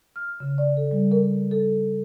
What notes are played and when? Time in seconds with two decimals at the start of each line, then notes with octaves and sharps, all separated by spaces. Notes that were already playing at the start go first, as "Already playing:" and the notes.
0.16 F6
0.40 C#3
0.58 D5
0.77 A4
0.91 G3
1.12 A#4
1.51 A4